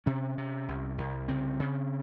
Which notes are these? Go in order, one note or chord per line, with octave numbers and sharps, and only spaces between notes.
C3 C#4
C3
C2
C2
C#3 C4
C#3